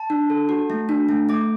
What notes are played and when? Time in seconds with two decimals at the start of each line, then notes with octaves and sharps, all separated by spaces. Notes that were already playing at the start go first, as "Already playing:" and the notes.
Already playing: A5
0.10 D4
0.30 A4
0.49 F#4
0.70 A3
0.89 D4
1.09 A3
1.29 A3 D6